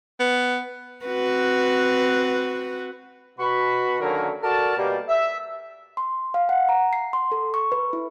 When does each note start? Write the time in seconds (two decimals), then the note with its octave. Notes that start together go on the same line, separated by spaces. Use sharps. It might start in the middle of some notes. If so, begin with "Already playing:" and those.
0.20 B3
1.05 C4 F#4 B4
3.39 B2 F#4 B5
4.00 D3 D#3 F#3 A#3 C#4 A#4
4.42 F#4 A4 A#4 D5 A5
4.76 B2 G3 A#3
5.08 E5
5.97 C6
6.34 F5
6.49 F#5
6.69 A#5
6.93 C7
7.13 C6
7.32 A4
7.54 C#6
7.72 B4
7.93 E4